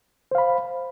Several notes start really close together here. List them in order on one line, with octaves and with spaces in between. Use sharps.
C5 F5 B5